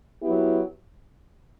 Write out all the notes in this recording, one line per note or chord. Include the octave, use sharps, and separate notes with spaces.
F#3 B3 E4 G4